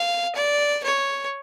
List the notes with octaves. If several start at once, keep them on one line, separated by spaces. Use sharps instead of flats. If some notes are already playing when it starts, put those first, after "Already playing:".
Already playing: F5
D5
C#5